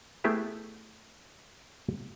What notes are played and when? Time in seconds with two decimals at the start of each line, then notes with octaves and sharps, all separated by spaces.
0.24 A3 B3 E4 G4 G#4 E5